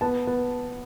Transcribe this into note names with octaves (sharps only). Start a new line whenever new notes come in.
B3 A5
B3